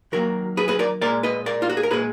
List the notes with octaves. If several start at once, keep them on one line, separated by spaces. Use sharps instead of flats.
D#3 F#3 A#3 F#4 A#4
G#4 B4
G#4 B4
A#4 D5
A#2 G#3 A#4 D5
B4 D#5
A#4 D5
F4
F#4
G#4
A#4
A#2 G#3 G#4 B4